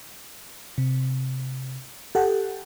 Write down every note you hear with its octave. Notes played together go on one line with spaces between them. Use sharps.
C3
G4 A4 F#5